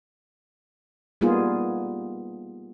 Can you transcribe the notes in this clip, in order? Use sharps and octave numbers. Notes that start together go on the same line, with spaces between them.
G3 A#3 B3 D#4 F4 G#4